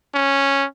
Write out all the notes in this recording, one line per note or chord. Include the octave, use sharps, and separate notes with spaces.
C#4